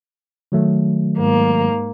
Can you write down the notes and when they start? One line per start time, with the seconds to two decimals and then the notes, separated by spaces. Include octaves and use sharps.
0.52 D#3 F#3 A3
1.17 G#2 A#3